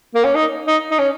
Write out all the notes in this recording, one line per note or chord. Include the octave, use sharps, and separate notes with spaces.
A#3
C#4
D#4
D#4
D#4
C#4